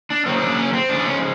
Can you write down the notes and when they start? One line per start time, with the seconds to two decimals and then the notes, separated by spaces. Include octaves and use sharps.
0.10 D4
0.26 C#3 F#3 A#3 C4
0.42 D4
0.58 C#4
0.73 C4
0.89 C#3 F3 G#3 D4
1.05 C#4